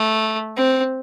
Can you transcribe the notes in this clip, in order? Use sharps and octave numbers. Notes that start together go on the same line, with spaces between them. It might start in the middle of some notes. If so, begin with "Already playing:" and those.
Already playing: A3
C4